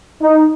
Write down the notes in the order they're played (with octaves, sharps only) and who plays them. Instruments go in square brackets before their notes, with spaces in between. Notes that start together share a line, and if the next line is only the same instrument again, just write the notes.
[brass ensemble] D#4